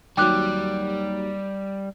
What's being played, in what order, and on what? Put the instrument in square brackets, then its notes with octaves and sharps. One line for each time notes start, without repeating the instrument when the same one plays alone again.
[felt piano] D#2 F#3 [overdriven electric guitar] G3 [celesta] G5 D6 F#6